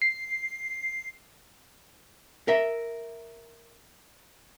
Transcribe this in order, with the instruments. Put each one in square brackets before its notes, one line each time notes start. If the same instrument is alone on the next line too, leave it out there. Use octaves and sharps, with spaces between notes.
[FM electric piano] C7
[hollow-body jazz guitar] A#4 E5